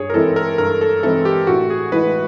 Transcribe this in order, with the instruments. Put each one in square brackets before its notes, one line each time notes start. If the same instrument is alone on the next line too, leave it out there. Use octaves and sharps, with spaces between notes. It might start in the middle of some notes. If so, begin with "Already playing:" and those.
Already playing: [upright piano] G2 [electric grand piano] G#4 C#5
[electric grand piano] A#4
[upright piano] E3 G#3 C4 E4 [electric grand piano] A4
[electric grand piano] A#4
[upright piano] G2 [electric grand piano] A#4
[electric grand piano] A4
[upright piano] E3 G#3 C4 E4 [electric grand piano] A4
[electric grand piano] G4
[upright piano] A1 [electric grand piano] F#4
[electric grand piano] G#4
[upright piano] A2 E3 G#3 [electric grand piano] B4